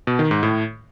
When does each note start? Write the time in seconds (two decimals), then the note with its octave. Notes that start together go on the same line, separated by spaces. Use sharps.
0.07 B2
0.19 D#3
0.31 G#2
0.43 A2